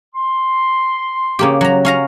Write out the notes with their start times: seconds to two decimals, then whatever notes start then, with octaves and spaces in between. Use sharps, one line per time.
0.15 C6
1.39 C#3 A#3 G4
1.61 F#3 A#5
1.85 C#4 F5 A#5